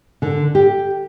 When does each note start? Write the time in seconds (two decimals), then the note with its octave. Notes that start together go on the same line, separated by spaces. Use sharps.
0.22 D3
0.55 G4